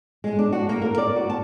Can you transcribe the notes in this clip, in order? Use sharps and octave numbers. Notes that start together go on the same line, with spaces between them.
G#3
D4
F#4
A#3
A#4
D5
F#4
A5